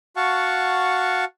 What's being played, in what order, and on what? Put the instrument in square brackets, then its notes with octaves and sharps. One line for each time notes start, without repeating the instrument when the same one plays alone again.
[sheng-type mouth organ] F#4 F5 F#5 A5 C#6